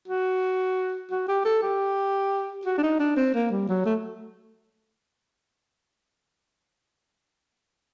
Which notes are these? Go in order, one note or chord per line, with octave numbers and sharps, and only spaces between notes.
F#4
F#4
G4
A4
G4
F#4
D4
D#4
D4
C4
A#3
G3
F#3
A3